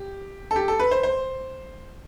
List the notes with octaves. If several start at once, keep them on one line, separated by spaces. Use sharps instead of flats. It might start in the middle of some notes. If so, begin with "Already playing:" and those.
Already playing: G4
A4
G4
A4
B4
C5
C5